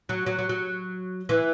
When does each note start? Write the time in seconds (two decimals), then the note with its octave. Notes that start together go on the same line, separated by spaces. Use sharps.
0.09 F#3
0.26 F#3
0.39 F#3
0.49 F#3
1.29 E3